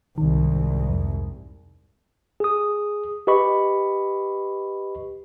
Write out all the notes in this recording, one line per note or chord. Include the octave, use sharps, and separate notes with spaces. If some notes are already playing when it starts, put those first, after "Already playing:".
C2 G#2 D#3
F2
G#4 D#6
G4 B4 D#5 B5 C#6